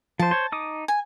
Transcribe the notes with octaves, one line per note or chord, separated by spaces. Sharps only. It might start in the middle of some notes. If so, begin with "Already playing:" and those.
F3 C5 A5
C5 C#5
D#4 D6 D#6
G#5